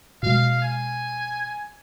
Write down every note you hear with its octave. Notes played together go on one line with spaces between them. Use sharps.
B2 G#3 F5
G#5